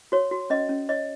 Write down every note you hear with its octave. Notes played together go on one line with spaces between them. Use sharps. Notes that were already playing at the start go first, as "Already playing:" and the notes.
F#4 C#5
F#4
C#4 D#5
C#4
C#5 D#5